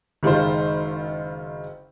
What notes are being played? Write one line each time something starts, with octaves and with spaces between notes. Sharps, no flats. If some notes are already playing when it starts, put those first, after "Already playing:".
F#1 D#3 G#3 F4 C5